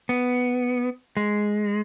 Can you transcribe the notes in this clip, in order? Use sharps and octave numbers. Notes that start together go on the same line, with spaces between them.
B3
G#3